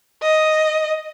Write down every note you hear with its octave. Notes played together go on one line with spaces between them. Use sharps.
D#5